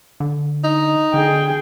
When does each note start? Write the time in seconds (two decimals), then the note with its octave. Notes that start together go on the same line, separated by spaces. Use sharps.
0.20 D3
0.64 D#4
1.14 D3 G#4 G5